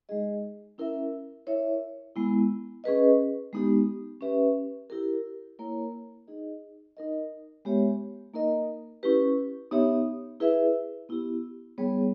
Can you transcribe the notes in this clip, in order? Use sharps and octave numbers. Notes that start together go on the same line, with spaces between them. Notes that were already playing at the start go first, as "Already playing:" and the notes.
G#3 D#4 G#4 D#5
C#4 E4 A#4 E5
E4 A#4 C#5 E5
G#3 B3 E4
C#4 G#4 B4 D#5
G#3 B3 D#4 G4
C#4 G4 B4 E5
E4 G4 A#4
A#3 E4 A#4 C#5
D#4 G#4 D#5
D#4 A#4 D#5
G#3 B3 G4 C#5 E5
A#3 D#4 A#4 D#5
C#4 E4 G4 B4
B3 D#4 G4 C#5 E5
E4 G#4 B4 E5
B3 E4 G4
G3 B3 D#4 G#4 C#5